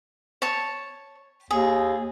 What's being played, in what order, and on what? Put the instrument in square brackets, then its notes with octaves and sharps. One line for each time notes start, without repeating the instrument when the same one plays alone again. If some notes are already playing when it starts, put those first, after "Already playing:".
[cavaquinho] C#5 A5
[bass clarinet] D#2 [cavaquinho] G#4